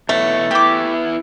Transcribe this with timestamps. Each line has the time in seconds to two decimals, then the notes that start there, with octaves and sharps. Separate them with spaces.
0.09 B2 E3 A3 C#5
0.51 B3 E4 G4 D6